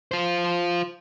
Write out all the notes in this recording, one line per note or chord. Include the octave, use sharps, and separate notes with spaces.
F4 C5